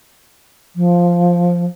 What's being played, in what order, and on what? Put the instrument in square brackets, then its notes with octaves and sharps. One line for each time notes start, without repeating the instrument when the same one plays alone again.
[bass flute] F3